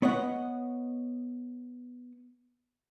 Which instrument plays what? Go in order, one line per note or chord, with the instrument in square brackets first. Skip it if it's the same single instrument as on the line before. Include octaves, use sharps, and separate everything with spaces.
[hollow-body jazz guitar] B3 C#5 D#5 F#5